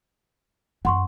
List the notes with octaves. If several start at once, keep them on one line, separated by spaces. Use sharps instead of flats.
F#2 F#5 C6 C#6